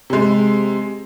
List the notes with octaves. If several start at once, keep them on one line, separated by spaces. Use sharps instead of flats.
C3 G#3